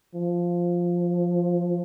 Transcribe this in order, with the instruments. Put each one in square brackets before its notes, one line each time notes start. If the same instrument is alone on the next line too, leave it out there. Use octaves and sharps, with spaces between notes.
[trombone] F3